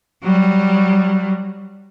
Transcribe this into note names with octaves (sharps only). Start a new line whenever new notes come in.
F#3 G3